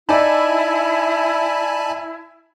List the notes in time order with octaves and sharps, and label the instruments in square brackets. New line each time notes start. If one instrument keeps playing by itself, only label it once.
[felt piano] D#4 D5 [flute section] E4 [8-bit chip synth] G#5 A5 B5